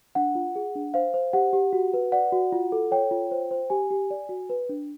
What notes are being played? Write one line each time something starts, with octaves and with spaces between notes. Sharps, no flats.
D4 F#5
F4
G#4
D4
C5 F5
C5
G4 F#5
G4
F#4
B4
D5 F#5
F#4
F4
A4
C#5 G5
F4
C5
C5
G4 G#5
G4
D5
F#4
B4
D4